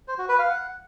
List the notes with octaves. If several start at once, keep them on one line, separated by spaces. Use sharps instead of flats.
C5
F#4
B4
F5
F#5